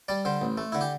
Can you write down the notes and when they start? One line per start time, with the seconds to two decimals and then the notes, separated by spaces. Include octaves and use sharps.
0.08 G3 D5
0.25 D3 C5
0.41 A1
0.58 A3
0.72 D3 E4
0.81 G4